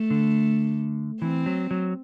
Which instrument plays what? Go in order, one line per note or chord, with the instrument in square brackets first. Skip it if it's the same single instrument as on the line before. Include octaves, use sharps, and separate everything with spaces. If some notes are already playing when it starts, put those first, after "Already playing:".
Already playing: [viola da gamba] A3
[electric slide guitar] D3
[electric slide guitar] E3 [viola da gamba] C4
[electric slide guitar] F#3
F#3